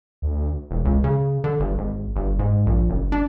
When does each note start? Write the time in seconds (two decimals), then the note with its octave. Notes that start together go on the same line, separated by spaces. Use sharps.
0.22 D2
0.71 E1
0.85 C#2
1.04 C#3
1.44 D3
1.60 G1
1.78 G#1
2.16 G1
2.39 G#2
2.66 A#1
2.90 F#1
3.12 D4